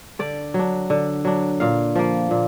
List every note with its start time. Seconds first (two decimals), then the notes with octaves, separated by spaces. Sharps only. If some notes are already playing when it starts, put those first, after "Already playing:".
0.19 D3 D5
0.54 F#3 D4
0.90 D3
1.25 F#3 D4
1.60 A#2 F5
1.96 F3 A#3
2.31 A#2